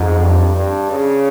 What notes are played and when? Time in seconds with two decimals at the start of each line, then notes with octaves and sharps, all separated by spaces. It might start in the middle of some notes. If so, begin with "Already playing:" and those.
Already playing: F2 G#2
0.22 G2
0.57 G2
0.91 C#3